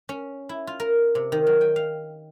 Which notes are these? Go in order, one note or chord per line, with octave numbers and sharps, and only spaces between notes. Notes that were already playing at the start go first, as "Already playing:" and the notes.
C#4
E4
F4
A#4
C3
D#3
F#3
G5
F5